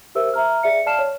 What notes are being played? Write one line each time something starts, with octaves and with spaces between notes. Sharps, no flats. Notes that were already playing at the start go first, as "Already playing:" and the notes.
G4 A#4 C5 E5 E6
E5 A#5 F6
G#4 D5 E5 C#7
D5 F5 A5 F6 C7 E7
C#5